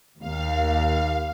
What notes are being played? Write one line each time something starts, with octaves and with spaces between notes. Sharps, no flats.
D#2 F5